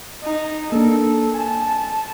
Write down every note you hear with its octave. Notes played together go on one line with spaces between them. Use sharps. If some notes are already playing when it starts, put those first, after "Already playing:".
D#4
A#3 D4 A4
G#5 A5